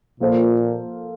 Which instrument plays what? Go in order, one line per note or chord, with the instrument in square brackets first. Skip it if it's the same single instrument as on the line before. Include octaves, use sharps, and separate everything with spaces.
[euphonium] A#2 [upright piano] F3 A#3 F4 A4 C5